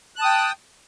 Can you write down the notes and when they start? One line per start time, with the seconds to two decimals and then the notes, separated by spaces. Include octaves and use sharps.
0.16 F#6
0.19 A5
0.22 D#6
0.25 G5